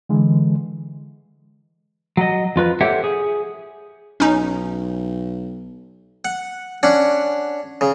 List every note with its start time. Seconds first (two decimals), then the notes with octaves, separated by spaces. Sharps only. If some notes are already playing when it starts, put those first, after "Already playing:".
0.09 D3 E3 G#3
2.17 F#3 D#5
2.56 F2 F4 B4
2.81 G4 A4 C5 C#5 E5 F#5
3.04 G#4
4.20 B1 C#4 D#4
6.25 F#5
6.83 C#4 D4 F#5
7.81 C#3